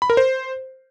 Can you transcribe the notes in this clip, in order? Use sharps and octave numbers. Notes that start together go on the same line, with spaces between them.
B5
A#4
C5